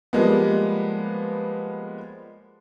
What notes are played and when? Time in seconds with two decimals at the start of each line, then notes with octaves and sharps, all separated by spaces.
0.13 F3 G3 G#3 A#3 B3